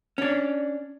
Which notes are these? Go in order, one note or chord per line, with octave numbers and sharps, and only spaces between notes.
C#4 D4